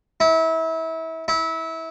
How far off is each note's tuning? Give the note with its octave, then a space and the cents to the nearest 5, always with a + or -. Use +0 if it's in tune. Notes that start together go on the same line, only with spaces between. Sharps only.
E4 -30
E4 -25